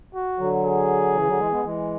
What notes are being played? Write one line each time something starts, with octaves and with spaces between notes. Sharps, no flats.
F#4
D3 F#3
G#4
C#3 E3
D3 F#3
E3 G#3
G#3 B3
E3 G#3